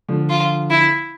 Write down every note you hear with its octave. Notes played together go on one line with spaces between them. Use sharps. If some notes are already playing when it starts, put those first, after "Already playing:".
D3 F3
F4
E4